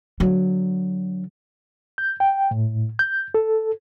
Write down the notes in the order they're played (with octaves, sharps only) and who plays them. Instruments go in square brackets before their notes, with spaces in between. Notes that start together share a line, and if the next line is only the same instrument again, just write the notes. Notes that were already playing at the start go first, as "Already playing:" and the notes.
[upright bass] D3 F#3
[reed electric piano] G6
G5
A2
G6
A4